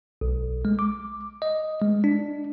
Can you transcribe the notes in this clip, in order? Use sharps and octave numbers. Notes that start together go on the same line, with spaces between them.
B1
G#3
D6
D#5
G#3
D4